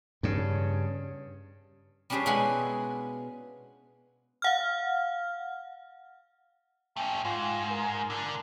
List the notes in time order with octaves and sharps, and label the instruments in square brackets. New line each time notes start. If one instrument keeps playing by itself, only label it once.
[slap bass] G2 C#3
[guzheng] G3 C#4 D4 G4 G#4 C5
B2 G#3 E4 F4 F#5 G#5
[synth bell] F5 F#5 F6
[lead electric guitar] A3 C#4 [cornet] G5
[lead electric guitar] G#2 [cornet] F4
[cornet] A#4
[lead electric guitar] D3 D4